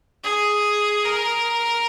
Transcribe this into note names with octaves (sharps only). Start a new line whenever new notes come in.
G#4
A#4